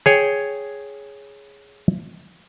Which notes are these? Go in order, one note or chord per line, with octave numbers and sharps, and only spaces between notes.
G#4 C#5 G5